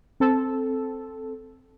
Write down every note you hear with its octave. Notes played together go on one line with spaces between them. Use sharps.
C4 A4